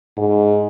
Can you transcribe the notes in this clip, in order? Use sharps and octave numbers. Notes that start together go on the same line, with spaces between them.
G#2